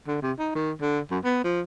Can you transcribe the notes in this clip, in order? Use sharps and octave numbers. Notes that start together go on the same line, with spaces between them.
D3
C3
D#4
D#3
D3
F#2
B3
F3